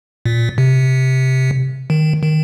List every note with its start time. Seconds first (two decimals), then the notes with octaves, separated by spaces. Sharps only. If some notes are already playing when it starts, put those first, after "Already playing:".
0.26 A#2
0.58 C3
1.90 D#3
2.23 D#3